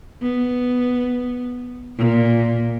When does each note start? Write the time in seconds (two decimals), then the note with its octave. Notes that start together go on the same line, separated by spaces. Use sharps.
0.22 B3
1.97 A#2